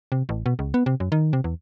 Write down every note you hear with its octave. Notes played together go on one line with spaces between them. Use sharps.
C3
A1
B2
C#2
B3
C3
F#2
D#3
C3
E2